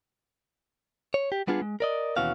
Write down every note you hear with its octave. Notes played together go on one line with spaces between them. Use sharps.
C#5
G4
G3 B3 D4 F4 G#4
G#3
A#4 D5 D#5
D#2 B2 E3 C#4 F#4 F5